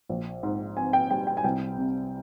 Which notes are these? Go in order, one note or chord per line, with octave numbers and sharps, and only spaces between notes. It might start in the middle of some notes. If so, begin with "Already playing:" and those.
A#1
G#2
C4 G#5
G5
G3 G5
G5
G#5
C2 G5
C3